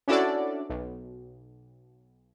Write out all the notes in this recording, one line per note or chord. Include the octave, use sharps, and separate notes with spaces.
C#4 D4 E4 F#4 A4 D5
B1